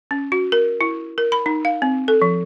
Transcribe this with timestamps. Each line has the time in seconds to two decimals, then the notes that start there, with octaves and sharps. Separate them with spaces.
0.11 C#4
0.32 F#4
0.52 A#4
0.81 E4
1.18 A#4
1.32 B5
1.46 D#4
1.65 F5
1.82 C4
2.08 A4
2.22 F3